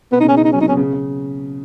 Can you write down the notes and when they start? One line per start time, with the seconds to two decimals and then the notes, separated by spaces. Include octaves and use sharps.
0.12 B2 B3
0.20 D#4
0.23 C#3
0.28 C#4
0.33 C#3 D#4
0.44 D#4
0.52 F#3 C#4
0.60 C#3 D#4
0.68 B2 C#4
0.77 C#3
0.93 C#3